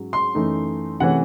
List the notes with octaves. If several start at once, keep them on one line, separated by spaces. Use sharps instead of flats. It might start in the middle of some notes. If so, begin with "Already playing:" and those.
Already playing: G#2 F#3 C#4
C6
F#2 E3 A3 D#4
C3 E3 A3 C#4 F#5